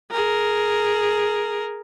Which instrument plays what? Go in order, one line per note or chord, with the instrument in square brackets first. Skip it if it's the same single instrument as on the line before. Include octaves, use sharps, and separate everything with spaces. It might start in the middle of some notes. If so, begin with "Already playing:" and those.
[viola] G#4 A#4